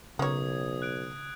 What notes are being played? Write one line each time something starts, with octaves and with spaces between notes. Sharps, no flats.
B1 C#3 A#3 C#5 D#6 G#6
F#6 D7